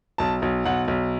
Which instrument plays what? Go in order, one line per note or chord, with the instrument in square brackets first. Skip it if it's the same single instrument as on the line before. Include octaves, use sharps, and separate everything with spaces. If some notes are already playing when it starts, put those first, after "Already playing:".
[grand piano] B1 A5
B1
B1 F#5
B1